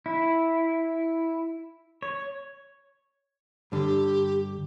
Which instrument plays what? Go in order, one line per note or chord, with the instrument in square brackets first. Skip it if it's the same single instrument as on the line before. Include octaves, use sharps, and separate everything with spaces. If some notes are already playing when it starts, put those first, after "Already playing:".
[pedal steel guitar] E4
C#5
[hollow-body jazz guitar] G2 D3 [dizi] G4